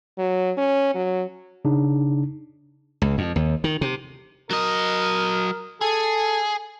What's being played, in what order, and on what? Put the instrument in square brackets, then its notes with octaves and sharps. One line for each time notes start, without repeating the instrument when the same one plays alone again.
[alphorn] F#3
C#4
F#3
[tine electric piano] C#3 D4 D#4
[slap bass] C#2
F2
D#2
D#3
C3
[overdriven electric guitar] F#3 D#5 [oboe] A#4
[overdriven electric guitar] G#4 [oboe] A4